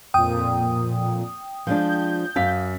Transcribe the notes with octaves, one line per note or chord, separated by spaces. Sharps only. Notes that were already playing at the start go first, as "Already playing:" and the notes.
F2 A#2 G5 D#6
F3 G#3 D4 G6
F#2 F5 B6